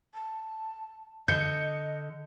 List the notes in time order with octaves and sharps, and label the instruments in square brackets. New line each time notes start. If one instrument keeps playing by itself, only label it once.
[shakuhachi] A5
[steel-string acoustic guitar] D3 [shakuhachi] D#5 [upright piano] G6 C#7